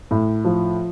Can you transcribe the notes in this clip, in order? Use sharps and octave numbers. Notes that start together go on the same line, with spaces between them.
A2
F3